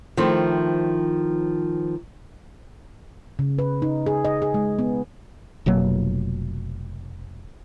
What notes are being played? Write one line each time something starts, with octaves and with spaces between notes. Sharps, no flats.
D#3 F3 A3 C4 E4
C#3
B4
D#4
G#4
D#5
G#4
G#3
B3
F1 B2 F#3 A#3